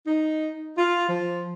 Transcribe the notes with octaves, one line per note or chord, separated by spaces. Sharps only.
D#4
F4
F3